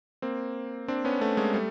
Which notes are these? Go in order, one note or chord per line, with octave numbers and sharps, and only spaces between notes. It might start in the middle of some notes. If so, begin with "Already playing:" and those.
A#3 C4
C4 D4
B3 C#4
A3 B3
G#3 A#3
G3 A3